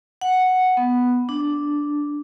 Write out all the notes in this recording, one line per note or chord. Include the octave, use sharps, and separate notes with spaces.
F#5
B3
D4